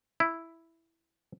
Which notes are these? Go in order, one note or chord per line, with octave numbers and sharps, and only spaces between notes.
E4